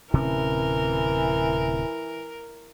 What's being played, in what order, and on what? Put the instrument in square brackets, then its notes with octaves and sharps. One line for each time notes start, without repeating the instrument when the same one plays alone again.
[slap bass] D1 C3 C#4 [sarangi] E3 [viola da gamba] A#4